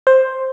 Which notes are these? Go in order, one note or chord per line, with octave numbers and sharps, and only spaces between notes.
C5